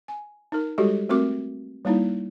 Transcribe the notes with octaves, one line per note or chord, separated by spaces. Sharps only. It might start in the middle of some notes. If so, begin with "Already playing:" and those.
G#5
D#4 A#4
G3 G#3 F#4 G4 A4
A3 C4 F#4 A#4 D6
G3 A#3 D#4 E4